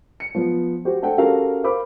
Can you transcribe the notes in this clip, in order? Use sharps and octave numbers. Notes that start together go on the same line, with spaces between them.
C#7
F3 B3
F#4 G4 C5
A3 D4 A4 C5 F#5 G5
C#4 F#4 G4 A4 A#4 F5
A#4 C5 F5 B5 D6